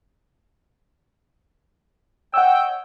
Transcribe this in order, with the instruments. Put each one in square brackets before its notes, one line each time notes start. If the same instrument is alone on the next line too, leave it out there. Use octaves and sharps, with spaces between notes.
[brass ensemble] C#5 D#5 G5 [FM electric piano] F#5 E6